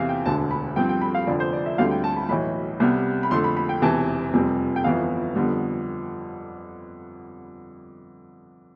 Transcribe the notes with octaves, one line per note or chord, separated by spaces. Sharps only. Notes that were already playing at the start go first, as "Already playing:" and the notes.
Already playing: E2 C3 E3 F5
G5
E1 D2 D3 A5
B5
G2 F3 C4 G5
G5
B5
F5
F1 F2 D3 D5
C5
D5
E5
D2 D3 G3 C4 F5
G5
A5
B5
B1 A2 E3 B5
C2 C3 G3 B3
B5
F2 D3 A3 C6
B5
B5
G5
E1 E2 C3 E3 A5
F1 F2 C3 G3
G5
G1 F2 E3 B3 F5
F2 D3 G3 B3